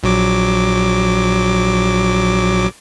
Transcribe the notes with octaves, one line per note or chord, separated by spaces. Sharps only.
A#1 F#3 D6